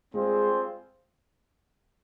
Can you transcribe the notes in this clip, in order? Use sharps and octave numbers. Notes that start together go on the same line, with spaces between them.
G3 G#3 C4 F4 G#4 C5